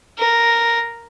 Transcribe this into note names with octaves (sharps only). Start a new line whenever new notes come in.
A#4